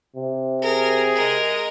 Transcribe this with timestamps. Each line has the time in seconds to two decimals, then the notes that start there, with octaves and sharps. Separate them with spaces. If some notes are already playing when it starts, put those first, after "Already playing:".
0.16 C3
0.62 G#4 A#4
1.15 G#3 A#4